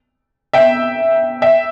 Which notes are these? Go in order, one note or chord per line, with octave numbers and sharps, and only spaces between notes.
E5 G5
E5 G5